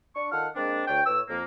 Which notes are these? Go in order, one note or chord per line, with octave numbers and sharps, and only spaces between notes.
D4 C#6
D#3 F4 A4 F#5 F6
G#3 A#3 C4 D4
D2 D4 C#5 G5
A2 B4 C#5 E6
F2 A#3